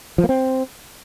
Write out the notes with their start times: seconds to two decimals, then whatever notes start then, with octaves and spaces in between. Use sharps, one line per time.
0.18 F3
0.24 A#3
0.29 C4